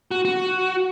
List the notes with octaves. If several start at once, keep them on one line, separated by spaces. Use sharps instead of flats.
F#4
F#4